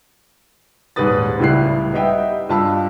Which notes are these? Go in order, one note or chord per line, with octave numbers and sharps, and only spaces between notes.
D#1 G#2 G3 B4 D#6 A6
C#2 A2 G3 E4 F#6 C7
G3 B3 D#4 D#5 E5 G5
G2 F4 A5 B5 E6